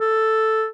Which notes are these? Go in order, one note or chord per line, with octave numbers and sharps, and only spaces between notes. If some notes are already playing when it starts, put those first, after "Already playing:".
A4